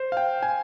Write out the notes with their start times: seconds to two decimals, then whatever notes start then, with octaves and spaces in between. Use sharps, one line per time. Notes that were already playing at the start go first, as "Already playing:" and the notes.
Already playing: C5
0.12 F5
0.17 G5
0.43 G#5